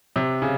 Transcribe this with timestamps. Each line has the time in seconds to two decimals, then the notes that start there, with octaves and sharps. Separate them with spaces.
0.16 C3
0.42 C#3